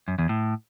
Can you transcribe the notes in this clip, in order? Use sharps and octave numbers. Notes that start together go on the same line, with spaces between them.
F#2
E2
A2